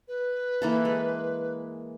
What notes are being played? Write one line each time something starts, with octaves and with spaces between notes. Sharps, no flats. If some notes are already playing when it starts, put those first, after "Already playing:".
B4
E3 A#3 A4
G#3